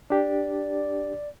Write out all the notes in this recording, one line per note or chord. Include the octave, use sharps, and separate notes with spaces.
D4 G4 D5